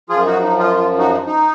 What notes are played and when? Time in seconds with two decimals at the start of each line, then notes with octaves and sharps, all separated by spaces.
0.09 F#2 F3 F4 G#4
0.26 D#4 F#4
0.43 D#4
0.59 F4
0.77 F4
0.99 D#4 F#4
1.26 D#4